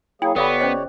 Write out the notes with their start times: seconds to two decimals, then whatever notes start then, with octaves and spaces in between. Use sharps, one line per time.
0.22 F#3 A#3 E4 G#4 G5
0.36 G1 B3 G4 A4 C#5 D5 F5 B5
0.60 C#4 C5 D#5